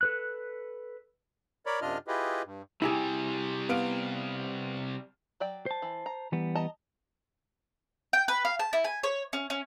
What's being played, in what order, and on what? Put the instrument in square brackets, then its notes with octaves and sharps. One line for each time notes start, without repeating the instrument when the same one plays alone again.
[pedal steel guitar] A4 B4 F#6
[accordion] A#4 C#5 D5 B5
F#2 C3 D4 F4 D#5 F6
E4 F4 G4 G#4 B4 D#5
G2
[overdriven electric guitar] C3 G3 [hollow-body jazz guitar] E4 G4 G#4
[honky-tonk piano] B3 F5 D7
[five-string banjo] F#3 D5 G5
[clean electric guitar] C5 A5
[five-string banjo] E3
A#5
[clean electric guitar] E3 G3 B3
[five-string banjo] D#5 A5 A#5
[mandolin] G5
B4
F5
A5
E4
G#5
C#5
C#4
C#4